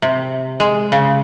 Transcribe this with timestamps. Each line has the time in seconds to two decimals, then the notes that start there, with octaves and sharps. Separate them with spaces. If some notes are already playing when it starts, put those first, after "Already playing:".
0.02 C3
0.60 G#3
0.92 C#3